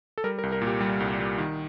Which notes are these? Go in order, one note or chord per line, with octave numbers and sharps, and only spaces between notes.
A4
G3 A#4
A#4
C2
A#4
A#2
G4
G3
C2
G3
D#3